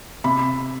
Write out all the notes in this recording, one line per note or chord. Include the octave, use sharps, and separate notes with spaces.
C3 B5